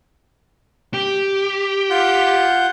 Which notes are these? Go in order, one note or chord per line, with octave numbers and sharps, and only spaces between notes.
G4
F4 F#5 G6